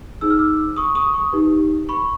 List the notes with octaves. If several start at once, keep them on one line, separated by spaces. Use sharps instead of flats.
D#4 G#4 C5 E6
F6
D6 E6
C#6 D#6
C#6 D#6
C#6 D#6
D#4 G4 B4
B5 C#6